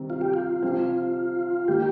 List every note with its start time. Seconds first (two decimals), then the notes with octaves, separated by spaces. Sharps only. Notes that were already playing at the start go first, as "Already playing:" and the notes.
Already playing: C3 D#3 G3 C4
0.10 F4
0.21 G4
0.34 F4
0.62 C3 F3 C4 F4 G4 C5
1.68 D#3 A#3 G4